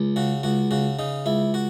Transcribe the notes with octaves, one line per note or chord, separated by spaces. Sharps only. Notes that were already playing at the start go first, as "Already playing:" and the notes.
Already playing: C#2
C#3 F#4
C#2 F#4
C#3 F#4
C#3 D#4
C#2 E4
F#4